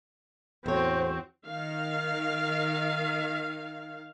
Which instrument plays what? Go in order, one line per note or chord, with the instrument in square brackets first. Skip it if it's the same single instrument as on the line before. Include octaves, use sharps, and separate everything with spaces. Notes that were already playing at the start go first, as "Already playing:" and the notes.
[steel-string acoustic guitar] E2 C#5 [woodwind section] A2 C5 [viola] C4 F#4
[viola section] D#3 F5